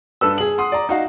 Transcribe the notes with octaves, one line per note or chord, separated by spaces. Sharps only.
G2 A4 B4 E6
G#4 F#7
F#5 C6 D#6
D5 A#5
D#4 F#4 F5 A#5